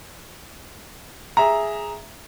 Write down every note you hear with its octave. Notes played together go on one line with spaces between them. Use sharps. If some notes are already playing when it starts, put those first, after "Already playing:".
G#4 E5 A#5